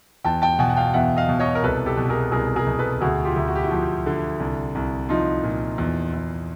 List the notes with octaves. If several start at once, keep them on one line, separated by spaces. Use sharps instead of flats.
E2 G5 A5
G5 A5
B2 F#5 G#5
F#5
F5 G5
E2 E5 F#5
D#5 F5
B2
C#5 D#5
A#4
C2 A4 B4
G4 A4
B2
G#4 A#4
C2 G#4 A#4
G#4 A#4
B2
A4 B4
D2 F#4 G#4
F4 G4
D2
F#4
G4
E4 F#4
F3
D3
C2
C2
F3 D#4 F4
A#2
E2
E2